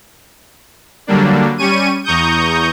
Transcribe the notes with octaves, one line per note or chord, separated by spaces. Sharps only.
D3 F#3 G3 A#3 D4
G3 C#4 C#6 D#7
E2 A#5 C#6 D#6 G6